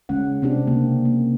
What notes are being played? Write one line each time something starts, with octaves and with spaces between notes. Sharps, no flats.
C#3 G#3 C#4 F#5
C3 C4 D4 G4
C#3 A#3
A#3